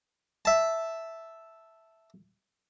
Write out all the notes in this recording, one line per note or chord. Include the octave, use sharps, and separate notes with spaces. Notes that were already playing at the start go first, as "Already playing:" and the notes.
E5 A5